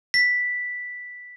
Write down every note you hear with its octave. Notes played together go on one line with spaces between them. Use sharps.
B6